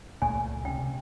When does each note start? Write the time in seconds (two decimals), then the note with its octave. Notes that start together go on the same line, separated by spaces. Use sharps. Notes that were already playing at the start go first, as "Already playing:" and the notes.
0.22 C#2 A#2 A3 G#5
0.65 C3 C#4 G5